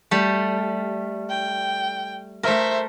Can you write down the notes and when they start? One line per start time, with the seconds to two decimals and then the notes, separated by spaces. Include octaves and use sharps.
0.11 G3 A3
1.29 G5
2.43 A3 A#4 C5 E5